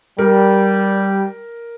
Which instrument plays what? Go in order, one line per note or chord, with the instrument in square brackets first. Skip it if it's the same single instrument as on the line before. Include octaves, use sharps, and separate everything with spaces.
[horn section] G3 [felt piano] A#4